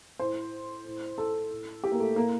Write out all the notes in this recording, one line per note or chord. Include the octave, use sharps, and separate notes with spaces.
A2 C5
A2
A4
A2
G4
A#3
A3
A2 A#3